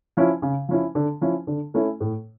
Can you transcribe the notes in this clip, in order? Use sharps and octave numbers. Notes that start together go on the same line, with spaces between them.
F3 C#4 E4
C#3
F3 C#4 E4
D3
F3 C#4 E4
D3
A3 C#4 E4
A2